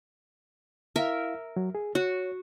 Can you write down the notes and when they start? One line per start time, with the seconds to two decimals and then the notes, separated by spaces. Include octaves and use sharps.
0.96 E4 A#4 E5 F5
1.56 F#3
1.75 G#4
1.95 F#4 C#5